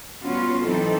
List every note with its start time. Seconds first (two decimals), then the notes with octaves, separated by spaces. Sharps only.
0.24 G3 B3 C#4 F4 F#4
0.63 E3 F#3 C4 D#4 A4